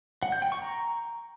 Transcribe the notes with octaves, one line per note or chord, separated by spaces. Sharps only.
F#5
G6
G5
C#6
A#5